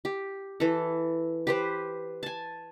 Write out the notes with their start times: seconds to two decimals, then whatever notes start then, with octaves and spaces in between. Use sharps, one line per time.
0.05 G4
0.60 E3 A4
1.47 G4 B4 C5
2.23 G#5 A5